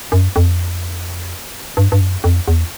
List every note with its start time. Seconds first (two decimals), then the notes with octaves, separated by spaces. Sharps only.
0.12 F#2
0.36 F2
1.77 G2
1.92 G2
2.01 F#2
2.24 F2
2.48 E2